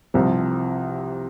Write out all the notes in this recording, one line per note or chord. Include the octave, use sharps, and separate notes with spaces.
C2 C3 F3